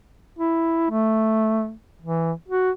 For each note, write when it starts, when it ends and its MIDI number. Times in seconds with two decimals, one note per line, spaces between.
0.39 0.87 64
0.91 1.72 57
2.02 2.32 52
2.49 2.71 66